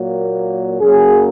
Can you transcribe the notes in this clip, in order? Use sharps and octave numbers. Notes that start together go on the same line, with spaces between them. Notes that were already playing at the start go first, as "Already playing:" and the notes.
Already playing: A#2 F#3 A#3
F#2 C#3 F#3 A#3 G#4